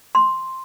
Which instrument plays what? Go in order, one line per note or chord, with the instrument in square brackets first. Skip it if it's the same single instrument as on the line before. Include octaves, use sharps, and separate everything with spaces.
[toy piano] C6